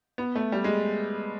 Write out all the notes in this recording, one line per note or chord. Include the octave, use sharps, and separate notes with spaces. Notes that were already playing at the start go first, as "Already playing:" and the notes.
B3
A3
G3
G#3